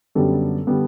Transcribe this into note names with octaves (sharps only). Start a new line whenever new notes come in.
F#2 D3 G3 B3 A4
D3 G3 B3